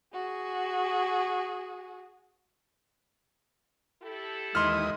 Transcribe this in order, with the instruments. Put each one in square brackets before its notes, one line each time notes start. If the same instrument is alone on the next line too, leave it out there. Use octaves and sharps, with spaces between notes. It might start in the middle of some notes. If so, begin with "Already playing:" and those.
[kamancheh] F#4 G#4
[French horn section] E4 G4 A4
[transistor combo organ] D#2 E3 D#6 [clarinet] G#3 [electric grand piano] C6 F6